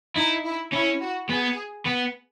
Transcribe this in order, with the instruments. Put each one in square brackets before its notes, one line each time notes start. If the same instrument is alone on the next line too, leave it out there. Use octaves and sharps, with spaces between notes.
[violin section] D#4 [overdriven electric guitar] E4
[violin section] E4
[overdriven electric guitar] C#4 [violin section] E4
[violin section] F#4
[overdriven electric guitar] B3 [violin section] G#4
[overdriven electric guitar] B3